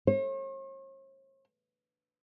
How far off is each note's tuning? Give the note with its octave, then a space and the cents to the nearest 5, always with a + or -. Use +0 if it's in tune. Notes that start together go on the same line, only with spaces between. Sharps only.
C#5 -45